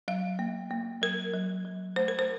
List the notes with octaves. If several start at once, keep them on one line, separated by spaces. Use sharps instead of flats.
F#3 F5
A#3
A#3
F#3 A#4
F#3
F#3
A3 C5
A#4
C5